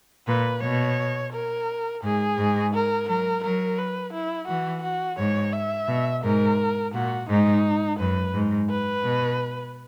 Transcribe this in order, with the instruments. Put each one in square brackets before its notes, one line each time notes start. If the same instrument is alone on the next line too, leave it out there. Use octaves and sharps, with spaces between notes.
[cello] A#2 [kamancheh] B4
[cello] B2 [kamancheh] C#5
[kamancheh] A#4
[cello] G#2 [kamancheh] G#4
[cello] G#2
[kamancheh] A#4
[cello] F#3 [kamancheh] A#4
[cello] F#3 [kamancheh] A#4
[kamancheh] B4
E4
[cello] E3 [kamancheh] F#4
[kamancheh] F#4
[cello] G#2 [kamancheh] C#5
[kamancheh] E5
[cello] B2
[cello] G#2 [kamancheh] A#4
[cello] A#2 [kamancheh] F#4
[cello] G#2 [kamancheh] D#4
[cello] F#2 [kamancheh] B4
[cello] G#2
[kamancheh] B4
[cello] B2